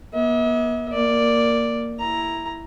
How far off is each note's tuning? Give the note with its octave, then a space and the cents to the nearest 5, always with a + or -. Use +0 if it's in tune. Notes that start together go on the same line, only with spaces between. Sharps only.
B3 -45 E5 -45
A#3 -5 D5 +0
E4 +0 A#5 +5